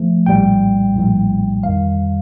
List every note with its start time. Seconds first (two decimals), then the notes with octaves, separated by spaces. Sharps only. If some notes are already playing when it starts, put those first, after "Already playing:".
Already playing: F3 A3
0.26 A#1 A2 G3 G5
0.95 A#1 A2 G3
1.63 F2 D#3 G3 F5